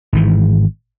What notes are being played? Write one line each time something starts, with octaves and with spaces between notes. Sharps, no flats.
G#1 G#2 E3